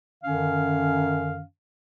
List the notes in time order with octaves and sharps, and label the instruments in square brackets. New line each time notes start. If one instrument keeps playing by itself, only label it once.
[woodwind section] F#2 D3 D#3 C#4 F5